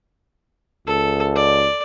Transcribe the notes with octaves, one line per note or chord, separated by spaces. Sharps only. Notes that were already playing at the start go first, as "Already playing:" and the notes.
C#2 A4
D5